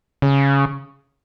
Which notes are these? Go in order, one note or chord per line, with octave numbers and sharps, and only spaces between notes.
C#3